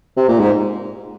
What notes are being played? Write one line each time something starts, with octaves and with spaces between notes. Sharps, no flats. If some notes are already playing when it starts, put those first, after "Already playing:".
C3
A#2
G#2